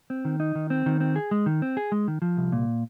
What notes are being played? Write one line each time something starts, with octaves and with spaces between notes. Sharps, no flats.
C4
D#3
D#4
D#3
C4
D#3
C4
G#4
G#3
D#3
C4
G#4
G#3
D#3
F3
C2
A#2